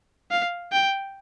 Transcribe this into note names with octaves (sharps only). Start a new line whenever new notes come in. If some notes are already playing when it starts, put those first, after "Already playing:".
F5
G5